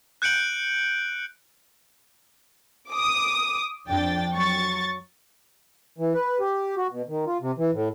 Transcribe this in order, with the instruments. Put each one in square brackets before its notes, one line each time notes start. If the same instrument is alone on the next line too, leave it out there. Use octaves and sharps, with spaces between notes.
[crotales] F#6 G6 C#7 D7 F#7
[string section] D6 D#6
F2 D4 G5 A6
F#3 C#6 A6
[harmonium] E3
B4
G4
F#4
B2
D#3
F4
C3
E3
A2